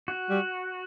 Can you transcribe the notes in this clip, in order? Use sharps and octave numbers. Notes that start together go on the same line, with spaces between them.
F#4
G3